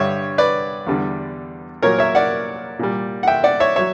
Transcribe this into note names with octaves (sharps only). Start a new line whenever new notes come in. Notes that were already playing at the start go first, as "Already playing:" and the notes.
Already playing: G2 D3 G3 C#5 E5
B4 D5
E2 D3 G3
A#2 F#3 A#4 C#5
C#5 E5
D5 F#5
A#2 G3
F#5
E5 G5
D5 F#5
C#5 E5
F#3 C#5 E5